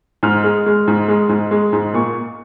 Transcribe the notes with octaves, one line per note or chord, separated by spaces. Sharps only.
G#2 F6
G#3
G#3
G#2
G#3
G#2
G#3
G#2
A#2 C#6